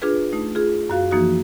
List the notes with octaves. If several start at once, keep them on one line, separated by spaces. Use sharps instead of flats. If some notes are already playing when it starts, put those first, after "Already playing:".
D4 F4 G#4 B4
A3 D#4
F4 G#4
F#2 F#4 F5
E3 F3 A#3 D#4 F#4